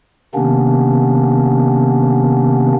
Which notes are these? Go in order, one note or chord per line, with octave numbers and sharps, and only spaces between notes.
C3 D#3 A#3 B3 C#4 D4